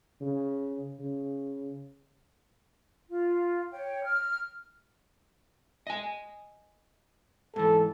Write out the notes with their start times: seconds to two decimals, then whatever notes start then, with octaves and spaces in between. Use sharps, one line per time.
0.21 C#3
0.99 C#3
3.10 F4
3.72 C#5 G5
4.06 F6
5.87 D#5 G#5
7.56 G#2 E3 A4